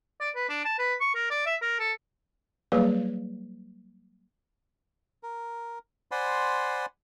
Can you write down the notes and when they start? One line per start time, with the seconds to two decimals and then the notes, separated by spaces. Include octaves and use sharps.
0.21 D5
0.36 B4
0.49 D4
0.65 A5
0.79 B4
1.00 C#6
1.15 A#4
1.30 D5
1.46 E5
1.62 A#4
1.79 A4
2.72 F#3 G3 A#3 G#4 B4 F5
5.23 A#4
6.11 C5 D5 F#5 G#5 B5 C6